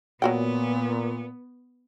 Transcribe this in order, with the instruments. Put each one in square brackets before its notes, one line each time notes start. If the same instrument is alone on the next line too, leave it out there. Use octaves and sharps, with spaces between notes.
[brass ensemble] A#2 [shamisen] F#3 F#4 G5 [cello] B3